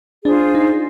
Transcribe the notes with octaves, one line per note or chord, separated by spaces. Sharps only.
D4 F4 G#4 C5
D#4